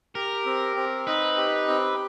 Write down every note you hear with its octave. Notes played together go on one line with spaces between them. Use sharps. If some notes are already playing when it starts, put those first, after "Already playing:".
G4 A#4
C4
C4
D#4 B4
G4
C4